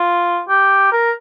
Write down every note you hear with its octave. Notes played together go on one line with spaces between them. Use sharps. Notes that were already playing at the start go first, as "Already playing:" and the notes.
Already playing: F4
G4
A#4